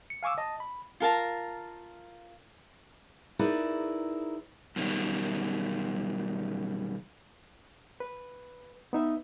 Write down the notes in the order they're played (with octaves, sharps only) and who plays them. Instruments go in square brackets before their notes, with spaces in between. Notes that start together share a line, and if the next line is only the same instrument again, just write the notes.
[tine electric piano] C#7
F5 G#5 C#6 D6 E6
D#5 A5
B5
[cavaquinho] F4 A#4 A5 A#5
[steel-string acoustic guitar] D#4 E4 G#4 A#4 B4 D5
[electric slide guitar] F#2 B2 D#3 G3
[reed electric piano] B4
B3 D#4 E5